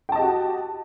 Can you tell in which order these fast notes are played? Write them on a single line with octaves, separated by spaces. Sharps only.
G5 A5 D#5 G4 F#4